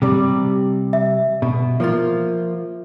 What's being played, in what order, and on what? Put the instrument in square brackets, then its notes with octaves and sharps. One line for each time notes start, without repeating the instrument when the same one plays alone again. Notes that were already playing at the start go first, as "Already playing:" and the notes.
[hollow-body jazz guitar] C3 G3
[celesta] E5
[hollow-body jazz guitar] B2
F3 A#3 F4